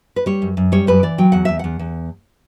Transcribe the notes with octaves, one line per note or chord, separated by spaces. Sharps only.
B4
G3 C#5
F#2
F#2
G3 C#5
F#2 B4
E3 D5
F#3 G5
E2 F#5
E2 E5
E2 F#5
E2